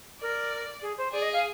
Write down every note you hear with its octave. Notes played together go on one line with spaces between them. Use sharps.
A#4 D5
G#4
C5
G#4 D5
D#5
F5